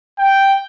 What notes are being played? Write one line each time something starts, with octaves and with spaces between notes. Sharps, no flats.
G5